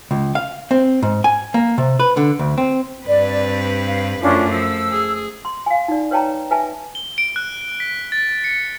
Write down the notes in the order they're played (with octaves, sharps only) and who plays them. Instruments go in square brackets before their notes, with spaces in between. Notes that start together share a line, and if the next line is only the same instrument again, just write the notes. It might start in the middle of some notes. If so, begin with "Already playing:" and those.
[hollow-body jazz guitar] C#2
F5
C4
G#2
G#5
A#3
C3
B4
D3
D2
C4
[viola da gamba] G2 C4 B4 [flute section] D5
[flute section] F5
[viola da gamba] F#2 F3 A3 [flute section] C#4 D4 F4
[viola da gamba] F3 [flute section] E6
[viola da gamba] G#4
[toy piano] C6
F5 G#5
D#4 D5
B4 C#5 G5 A5 A#5
B4 E5 G#5 A5
[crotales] G7
D7
F#6
B6
A6
C#7